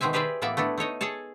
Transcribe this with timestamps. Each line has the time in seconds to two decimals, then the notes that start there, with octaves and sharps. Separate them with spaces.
0.01 B2 D#3 G#3 C4 E5 G#5
0.13 G4 G#4 B4 C5 D5 E5
0.42 A2 E3 A#3 B3 D5 E5
0.57 A3 B3 D4 E4
0.78 A3 D#4 C#5 D#5
1.01 G#4 A4 C#5 A5